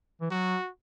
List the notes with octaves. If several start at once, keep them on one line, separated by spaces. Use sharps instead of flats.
E3
F#3 F#4